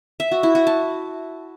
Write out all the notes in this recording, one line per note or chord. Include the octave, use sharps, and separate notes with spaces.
E5
F#4
E4
F#4
A5